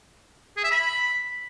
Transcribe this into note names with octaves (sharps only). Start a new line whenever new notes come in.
G#4
E5
B5